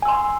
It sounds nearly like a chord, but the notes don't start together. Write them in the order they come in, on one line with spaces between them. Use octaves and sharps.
G#5 E6 C6